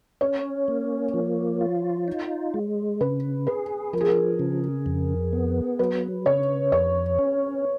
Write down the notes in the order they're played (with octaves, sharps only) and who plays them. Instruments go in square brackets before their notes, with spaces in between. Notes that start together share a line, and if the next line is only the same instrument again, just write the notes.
[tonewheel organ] C#4 [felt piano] C#5
[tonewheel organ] A#3
F3
F4
D#4
G#3
[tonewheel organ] C#3 [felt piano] B4
[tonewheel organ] G#4 [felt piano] B4
[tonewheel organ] F3 [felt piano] A#4
[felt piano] G#4
A#4
[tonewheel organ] C#3
F2
B3
[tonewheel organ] F#3 [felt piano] B4
[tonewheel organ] C#3 [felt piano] C#5
[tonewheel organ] F2 [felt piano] C#5
[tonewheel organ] C#4